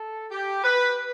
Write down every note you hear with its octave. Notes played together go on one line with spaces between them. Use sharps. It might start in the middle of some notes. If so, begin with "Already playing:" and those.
Already playing: A4
G4
B4